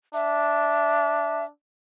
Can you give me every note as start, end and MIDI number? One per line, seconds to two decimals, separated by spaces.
0.14 1.50 62
0.14 1.44 76